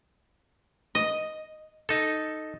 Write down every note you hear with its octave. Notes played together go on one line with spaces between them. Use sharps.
D#5
D#4 A4